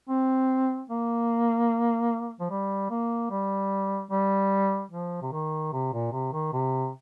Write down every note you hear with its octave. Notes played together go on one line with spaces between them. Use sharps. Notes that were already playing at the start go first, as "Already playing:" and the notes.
C4
A#3
F3
G3
A#3
G3
G3
F3
C3
D#3
C3
A#2
C3
D#3
C3